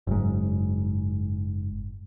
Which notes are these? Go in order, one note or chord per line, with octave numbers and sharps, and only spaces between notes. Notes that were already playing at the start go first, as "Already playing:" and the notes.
F#1 G#2